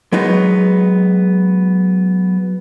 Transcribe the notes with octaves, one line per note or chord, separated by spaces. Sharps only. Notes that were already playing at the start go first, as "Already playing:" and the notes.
F#3 G#3 B3 D#4 B4